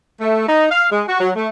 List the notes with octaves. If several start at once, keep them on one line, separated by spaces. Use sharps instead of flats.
A3
D#4
F5
G#3
F#4
F#3
A3